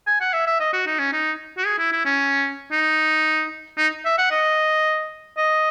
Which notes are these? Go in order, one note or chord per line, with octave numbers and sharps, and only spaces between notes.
G#5
F#5
E5
E5
D#5
F#4
D#4
C#4
D#4
F#4
G#4
E4
E4
C#4
D#4
D#4
E5
F#5
D#5
D#5